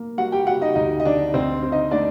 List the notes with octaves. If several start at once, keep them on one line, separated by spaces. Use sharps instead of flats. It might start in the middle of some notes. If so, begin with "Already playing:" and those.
Already playing: A#3
G3 F#4 F#5
G4 G5
G3 F#4 F#5
D#4 D#5
D2 D#4 D#5
D#5
D2 D4 D5
D2 C4 C5
C4
D#4 D#5
A3 D4 D5